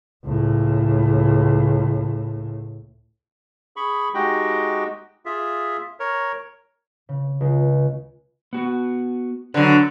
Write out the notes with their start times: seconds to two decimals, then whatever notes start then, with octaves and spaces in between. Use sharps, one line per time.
0.25 C#2 A2
3.76 G#4 B5 C#6
4.14 G#3 D#4 F#4 G4 D#5 G5
5.25 F4 G#4 E5
6.00 A#4 C#5
7.09 C#3
7.41 C#2
8.53 B3 F#4
9.54 D3 F#3 B4